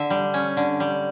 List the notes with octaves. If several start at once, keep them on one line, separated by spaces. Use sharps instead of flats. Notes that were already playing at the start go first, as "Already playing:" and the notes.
Already playing: D3 E5
G3
C#4
D3
G3